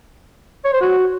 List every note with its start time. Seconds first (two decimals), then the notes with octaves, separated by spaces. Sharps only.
0.65 C#5
0.73 C5
0.81 F#4